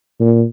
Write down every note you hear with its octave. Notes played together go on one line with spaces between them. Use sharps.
A#2